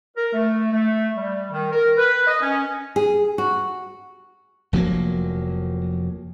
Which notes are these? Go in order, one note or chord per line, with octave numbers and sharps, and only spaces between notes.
A#4
A3
A3
G3
D#3
A#4
B4
D#5
C#4
G#4
F#4
F1 F3 F#3 A#3